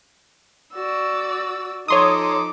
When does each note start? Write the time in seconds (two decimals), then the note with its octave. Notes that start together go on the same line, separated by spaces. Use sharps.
0.74 F#4 D5 E6
1.88 F3 D#4 A4 C#5 C6 D6 D#6